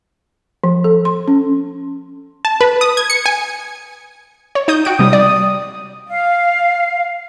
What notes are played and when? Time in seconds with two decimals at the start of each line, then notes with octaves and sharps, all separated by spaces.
0.64 F3
0.84 A4
1.05 C6
1.28 C#4
2.45 A5
2.61 B4
2.81 D#6
2.97 G#6
3.10 C#7
3.26 G#5
4.55 C#5
4.68 D#4 D#6 G6
4.85 F#4 G5 D7
4.99 C3 G3 D#6
5.13 D5
6.07 F5